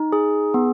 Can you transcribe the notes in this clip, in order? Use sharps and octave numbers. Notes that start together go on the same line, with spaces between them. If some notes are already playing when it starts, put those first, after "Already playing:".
Already playing: D#4
G#4
B3